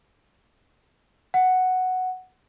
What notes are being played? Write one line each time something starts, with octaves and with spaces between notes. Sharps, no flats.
F#5